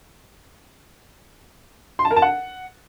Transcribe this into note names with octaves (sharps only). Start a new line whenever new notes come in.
C6
A5
A#4
A5
F#5